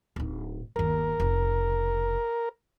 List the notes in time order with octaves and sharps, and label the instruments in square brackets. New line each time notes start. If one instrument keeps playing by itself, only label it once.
[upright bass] D1 D#4
[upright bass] G1 D#2 [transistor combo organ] A#4
[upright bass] F1 C#3